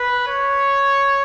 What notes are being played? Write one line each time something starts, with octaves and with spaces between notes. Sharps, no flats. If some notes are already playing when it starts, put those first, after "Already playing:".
Already playing: B4
C#5